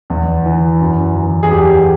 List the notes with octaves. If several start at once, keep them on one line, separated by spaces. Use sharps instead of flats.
E2
E3
F#2
E3
G#4
E2 G4